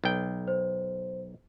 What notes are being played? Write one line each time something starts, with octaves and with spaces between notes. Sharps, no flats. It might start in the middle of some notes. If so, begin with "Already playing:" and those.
B1 G5
C5